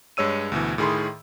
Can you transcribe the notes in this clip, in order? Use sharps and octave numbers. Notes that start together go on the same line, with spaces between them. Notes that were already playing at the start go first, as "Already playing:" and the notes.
G2 G#3 C#5 E6 D#7
D2 B2 E3
A2 D#3 G#4 B5 C6